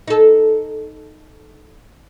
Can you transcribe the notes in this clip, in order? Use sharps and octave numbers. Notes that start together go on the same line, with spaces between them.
D#4 A4